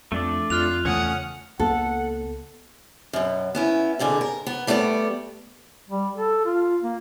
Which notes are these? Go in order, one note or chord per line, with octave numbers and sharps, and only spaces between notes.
F2 A3 D4 D5
F2 F4 F6 F#6 F7
E2 C#3 A3 C#4 F#5 D#6
C#2 A#3 B3 A4 F#5
F#2 B2
B3 C#4 E4
G2 B2 D3 G#4
A#4
B3
G3 A3 B3 G4 D5
G3
A4
F4
A#3